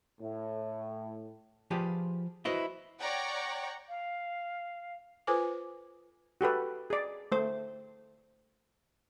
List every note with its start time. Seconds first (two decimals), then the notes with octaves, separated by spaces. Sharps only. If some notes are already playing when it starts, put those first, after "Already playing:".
0.21 A2
1.71 F3 F4 G4 G#4 B4 D5
2.45 E4 F#4 B4 C5 D#5 E5
2.99 C#5 D5 F#5 G5 A#5
3.89 F5
5.27 F4 A4 B4 C5 G#5 D6
6.41 F#4 G4 A4 B4
6.90 G#4 D5
7.32 A3 C5